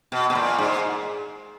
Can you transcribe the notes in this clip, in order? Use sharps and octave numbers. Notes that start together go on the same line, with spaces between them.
B2
B2
A#2
G#2